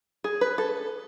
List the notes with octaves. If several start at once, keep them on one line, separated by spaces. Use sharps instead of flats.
G#4
B4
A4